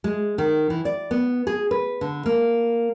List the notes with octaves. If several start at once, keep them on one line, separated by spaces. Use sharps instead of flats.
G#3
D#3
E3
D5
B3
G#4
B4
D3
A#3